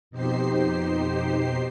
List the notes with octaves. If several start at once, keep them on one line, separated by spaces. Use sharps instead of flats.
F2 B2 D#4 G4 C5 C7